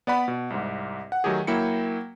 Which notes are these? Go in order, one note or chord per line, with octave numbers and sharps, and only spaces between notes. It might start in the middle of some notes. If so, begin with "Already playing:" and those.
B3 D5 F#5 B5
B2
C2 G#2
F#5
D#3 F#3 A3 G4 G#4
F#3 A#3 E4 G5 C#7